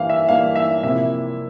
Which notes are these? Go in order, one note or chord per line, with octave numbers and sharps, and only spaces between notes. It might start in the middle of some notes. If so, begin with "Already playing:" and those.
Already playing: G2 E3 A#3 F5
E5
G2 E3 A#3 F5
E5
C3 F3 A#3 E4 E5